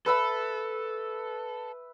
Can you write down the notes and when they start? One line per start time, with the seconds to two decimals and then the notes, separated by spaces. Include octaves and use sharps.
0.06 A4 B4 E5 B5